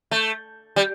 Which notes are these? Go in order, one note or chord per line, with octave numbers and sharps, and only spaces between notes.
A3
G3